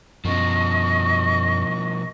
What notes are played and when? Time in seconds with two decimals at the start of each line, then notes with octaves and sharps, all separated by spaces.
0.25 F#2 B2 F3 D#5 C#6